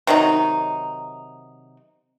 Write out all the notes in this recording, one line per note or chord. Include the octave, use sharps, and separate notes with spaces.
C3 D#3 F#3 D#4